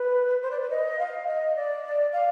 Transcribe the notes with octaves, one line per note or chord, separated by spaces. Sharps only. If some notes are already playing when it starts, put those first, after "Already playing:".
Already playing: B4
C5
D5
B4
D#5
F5
D#5
D5
F5